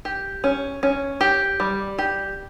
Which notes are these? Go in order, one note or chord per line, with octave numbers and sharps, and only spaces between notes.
G4
C#4
C#4
G4
G3
G4